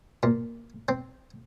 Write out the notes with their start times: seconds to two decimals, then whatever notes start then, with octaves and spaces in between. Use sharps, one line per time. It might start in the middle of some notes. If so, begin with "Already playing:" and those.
0.23 A#2
0.89 C4